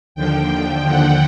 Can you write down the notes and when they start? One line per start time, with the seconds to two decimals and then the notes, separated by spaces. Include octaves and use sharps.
0.15 D#2 D3 F3 G5
0.87 F#5